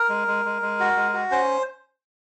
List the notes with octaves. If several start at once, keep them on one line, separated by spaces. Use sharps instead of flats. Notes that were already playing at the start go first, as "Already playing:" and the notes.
Already playing: A#4
G#3
G#3
G#3
G#3
F#4
G#3
F#4
C#4 C5